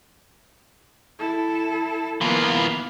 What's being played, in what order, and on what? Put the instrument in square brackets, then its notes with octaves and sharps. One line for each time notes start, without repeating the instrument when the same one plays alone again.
[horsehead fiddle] E4 A4
[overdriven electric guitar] E3 F4 [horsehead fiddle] A#3 B3